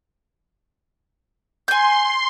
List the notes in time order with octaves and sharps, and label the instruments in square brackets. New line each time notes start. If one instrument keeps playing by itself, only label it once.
[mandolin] G#5 G6 [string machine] C6